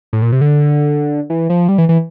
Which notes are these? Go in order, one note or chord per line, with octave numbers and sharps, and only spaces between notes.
A2
A#2
C3
D3
E3
F3
G3
E3
E3